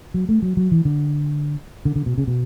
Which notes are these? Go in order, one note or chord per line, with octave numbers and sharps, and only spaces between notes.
F#3
A3
F#3
F#3
E3
D3
D3
D3
B2
C#3
B2